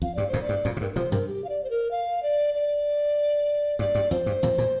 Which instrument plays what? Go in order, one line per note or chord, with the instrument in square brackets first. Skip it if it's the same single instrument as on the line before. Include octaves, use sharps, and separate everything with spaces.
[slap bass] F2 [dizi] F5
[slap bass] G2 [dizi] D5
[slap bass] F2 A#2 [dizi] C5
[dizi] D5
[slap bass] G2
F2 A#2
A#2
[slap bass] G2 [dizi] A#4
[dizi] A#4
[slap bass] C3 F3 [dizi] C5
[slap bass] G2 C3 [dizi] A#4
[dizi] G4
F5
D5
C5
A#4
F5
D5
D5
[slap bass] G2 [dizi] D5
[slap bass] G2
[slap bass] F2 [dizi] C5
[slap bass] G2
F2 A#2
A#2